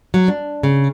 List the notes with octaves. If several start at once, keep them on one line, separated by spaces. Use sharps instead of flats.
F#3
D4
C#3